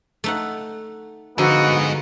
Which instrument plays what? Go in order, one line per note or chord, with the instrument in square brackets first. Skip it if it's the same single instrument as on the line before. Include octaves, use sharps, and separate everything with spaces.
[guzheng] A3 D#4 F#5
[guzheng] D3 F3 [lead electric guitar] G#3 D#4 [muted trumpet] B3 [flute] F#4